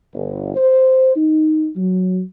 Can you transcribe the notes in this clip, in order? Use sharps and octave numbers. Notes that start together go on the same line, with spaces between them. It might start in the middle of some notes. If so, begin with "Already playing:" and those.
G1
C5
D#4
F#3